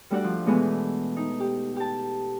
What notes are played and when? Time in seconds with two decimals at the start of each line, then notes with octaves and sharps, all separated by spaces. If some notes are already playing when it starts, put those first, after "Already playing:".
0.10 G3 A3 D4 F#4 D5 F#5
0.24 F3
0.46 B2 E3 G#3 A3 B3
1.16 D#4
1.40 G4
1.76 G4 A5